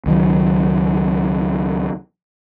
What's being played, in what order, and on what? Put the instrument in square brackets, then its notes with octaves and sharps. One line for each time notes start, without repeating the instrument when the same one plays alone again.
[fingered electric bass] C#2 D#3 F#3